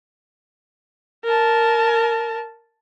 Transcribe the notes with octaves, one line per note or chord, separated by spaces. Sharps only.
A#4 A5